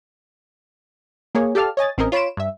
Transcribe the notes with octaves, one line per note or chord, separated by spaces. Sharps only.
A#3 G#4 C#5
G4 A4 D5 F5 A5 F6
C#5 D#5 G#5 A6
A1 C4 C#4 A#4 D#5
F4 C#5 B5 C6 D7 E7
G2 E5